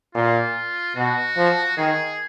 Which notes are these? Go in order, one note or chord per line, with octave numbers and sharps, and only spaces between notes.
A#2 F4
B2 F#4
F3
D#3 G#4